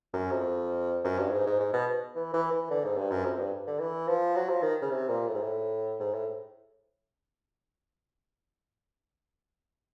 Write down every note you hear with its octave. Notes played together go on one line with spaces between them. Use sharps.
F#2
F2
F#2
G2
G#2
G#2
G#2
B2
E3
E3
E3
D3
G#2
G2
F#2
F2
G2
D3
E3
F3
F#3
F3
D#3
C#3
C3
A#2
A2
G#2
A2
G#2
A2